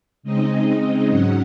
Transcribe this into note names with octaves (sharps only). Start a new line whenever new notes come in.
C#3 G#3 C4 D#4 D#5
D#5
G#2 F#3 C#4 F#5